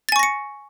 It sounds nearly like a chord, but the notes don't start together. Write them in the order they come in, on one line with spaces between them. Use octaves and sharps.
A6 G#5 C#6 A#6 C#7